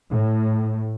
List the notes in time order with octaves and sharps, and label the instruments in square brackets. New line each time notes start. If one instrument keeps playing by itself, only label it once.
[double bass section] A2